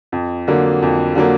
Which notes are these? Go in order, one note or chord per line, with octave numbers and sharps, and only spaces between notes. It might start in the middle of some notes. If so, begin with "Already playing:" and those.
F2
D3 F#3 A#3
F2
D3 F#3 A#3